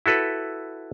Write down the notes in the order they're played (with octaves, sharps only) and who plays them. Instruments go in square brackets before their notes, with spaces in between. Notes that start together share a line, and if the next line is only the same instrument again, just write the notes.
[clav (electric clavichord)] E4 F#4 A4 B4